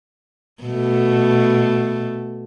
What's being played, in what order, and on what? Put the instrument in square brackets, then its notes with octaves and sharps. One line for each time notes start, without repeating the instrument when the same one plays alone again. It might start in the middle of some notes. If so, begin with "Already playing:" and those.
[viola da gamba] B2 A3